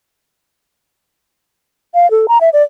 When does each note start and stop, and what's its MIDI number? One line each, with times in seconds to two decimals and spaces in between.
1.95 2.09 77
2.11 2.26 69
2.28 2.38 82
2.41 2.50 76
2.53 2.63 74